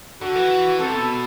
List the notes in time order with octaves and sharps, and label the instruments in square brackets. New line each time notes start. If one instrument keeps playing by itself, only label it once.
[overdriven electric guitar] D3 [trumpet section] F#4
[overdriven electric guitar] E3
[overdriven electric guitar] C3 [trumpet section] A4
[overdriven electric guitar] B2